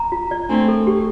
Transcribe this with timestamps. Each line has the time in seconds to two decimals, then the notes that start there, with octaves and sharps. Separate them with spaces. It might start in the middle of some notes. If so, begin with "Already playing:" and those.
Already playing: A#5
0.12 F4
0.31 D5
0.49 A3 C4 D4
0.68 A4
0.87 G4